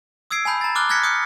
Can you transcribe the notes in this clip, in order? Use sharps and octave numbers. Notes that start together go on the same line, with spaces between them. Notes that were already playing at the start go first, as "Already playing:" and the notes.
D#6 E6 G#6 C7 D7
G#5 A5 B5 G6
A#5 A6
D6 D#6 F6 F#6 G7
F6 F#6 G#6 A#6 B6 C#7
D#6 G6 C#7